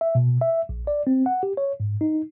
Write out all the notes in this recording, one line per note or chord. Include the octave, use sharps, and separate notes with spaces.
E5
B2
E5
A#1
D5
C4
F#5
G4
C#5
G#2
D#4